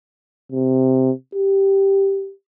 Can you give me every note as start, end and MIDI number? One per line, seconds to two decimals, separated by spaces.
0.52 1.11 48
1.35 2.32 67